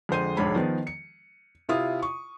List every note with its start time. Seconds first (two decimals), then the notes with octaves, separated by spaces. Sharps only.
0.09 F2 D3 G#3 C5 C7 D#7
0.37 E1 F2 G#2 D4 C#5 B5
0.55 D#3 F3 B3
0.87 C#7
1.69 C3 E4 F4 D#6
2.03 C#6